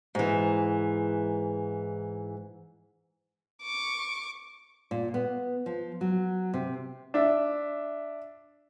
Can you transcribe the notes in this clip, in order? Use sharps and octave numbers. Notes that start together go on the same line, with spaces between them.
G#2 E3
C#6 D6
A#2
B3
F3
F#3
C3
D4 E5